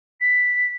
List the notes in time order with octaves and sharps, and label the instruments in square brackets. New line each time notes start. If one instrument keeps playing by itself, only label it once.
[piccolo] B6